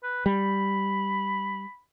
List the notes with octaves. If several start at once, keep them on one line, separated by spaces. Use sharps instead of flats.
B4
G3 B5